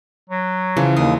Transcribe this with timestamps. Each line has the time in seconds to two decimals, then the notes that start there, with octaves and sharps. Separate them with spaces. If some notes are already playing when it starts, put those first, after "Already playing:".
0.30 F#3
0.77 C#3 E3 F3
0.96 D#2 F#3 C5 D#6